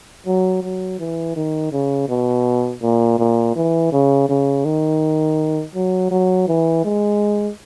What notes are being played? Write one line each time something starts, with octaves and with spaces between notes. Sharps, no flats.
F#3
F#3
E3
D#3
C#3
B2
A#2
A#2
E3
C#3
C#3
D#3
F#3
F#3
E3
G#3